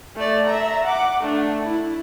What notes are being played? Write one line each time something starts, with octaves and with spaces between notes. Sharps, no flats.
A3 D5
E5 A#5
F#5 D6
A3 D4
E4